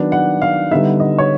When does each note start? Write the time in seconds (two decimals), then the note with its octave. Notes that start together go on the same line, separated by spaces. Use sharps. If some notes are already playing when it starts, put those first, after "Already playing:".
Already playing: D#3 F#3 B3 D4
0.12 F#5
0.42 F5
0.71 D3 G3 B3 D#4 E5
1.00 D#5
1.18 C#5